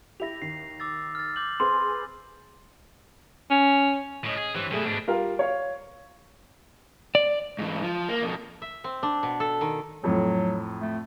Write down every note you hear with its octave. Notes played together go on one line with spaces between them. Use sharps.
E4 G4 A#6 F7
D#2 C7
D6 E6 A6
F6 A6
D6 G6 F#7
C4 G#4 B4 C6
C#4
A2 C#4 C#5 D#5
G#4
G2 E3 C4 C#5
B2 G3 A3 E4 G#4
G#2 B2 D4
G3 F4 A#4 F5
C#5 F5
D5
G#2 E3
F3
A#3
F2 B2
E5
C4
D4
B2
A4
D#3
F2 A2 F#3
A3